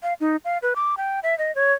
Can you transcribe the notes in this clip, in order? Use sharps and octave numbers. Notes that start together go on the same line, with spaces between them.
F5
D#4
F5
B4
D6
G5
E5
D#5
C#5